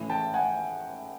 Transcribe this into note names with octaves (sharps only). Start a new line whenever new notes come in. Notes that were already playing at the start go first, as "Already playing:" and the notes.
Already playing: A1 A2 E3
G5 A5
F#5 G#5